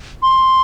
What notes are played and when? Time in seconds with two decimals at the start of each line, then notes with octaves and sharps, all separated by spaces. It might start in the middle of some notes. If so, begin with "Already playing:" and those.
0.23 C6